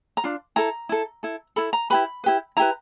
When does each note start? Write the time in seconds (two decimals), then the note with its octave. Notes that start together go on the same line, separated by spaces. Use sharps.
0.17 A#5
0.24 D4 F4
0.56 E4 A4 A#5
0.89 E4 A4
1.23 E4 A4
1.56 E4 A4 B5
1.73 A#5
1.90 E4 G4 B4 B5
2.24 E4 G4 B4
2.57 E4 G4 B4 A#5